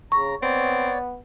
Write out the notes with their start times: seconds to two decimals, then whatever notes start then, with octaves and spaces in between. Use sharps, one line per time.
0.12 C#3 A#5 C#6
0.42 B3 C4 C#5 D5